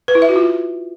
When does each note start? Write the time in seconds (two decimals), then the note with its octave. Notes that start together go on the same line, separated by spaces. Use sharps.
0.08 B4
0.15 E4
0.22 E5
0.29 F#4
0.36 F4